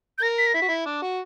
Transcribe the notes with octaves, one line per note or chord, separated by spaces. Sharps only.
G6
A#4 A#6
B6
A#6
E4 B6
F#4
E4
D4
F#4